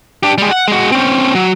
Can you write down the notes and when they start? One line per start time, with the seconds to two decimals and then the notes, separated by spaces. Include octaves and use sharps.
0.23 D4 G4
0.38 G3 G#3
0.51 F#5
0.68 G#3 F#4
0.92 C4 C#4
1.35 F#3